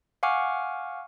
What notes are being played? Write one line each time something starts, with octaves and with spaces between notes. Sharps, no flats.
F5 F#5 G#5 C#6 D6 F6